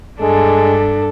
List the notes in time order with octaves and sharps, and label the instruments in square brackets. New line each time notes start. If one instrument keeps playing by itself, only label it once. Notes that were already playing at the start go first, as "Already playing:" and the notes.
[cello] G2 D4 [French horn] G#3 [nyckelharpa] A4